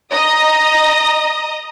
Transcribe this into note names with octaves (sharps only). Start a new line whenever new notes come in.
D#5 A#5 D#6